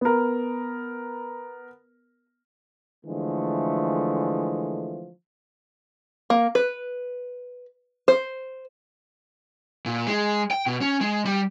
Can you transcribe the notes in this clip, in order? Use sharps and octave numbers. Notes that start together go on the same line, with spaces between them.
B3 A#4
D3 E3 F3 G#3 A3
A#3
B4
C5
A#2
G#3
G5
B2
C#4
G#3
G3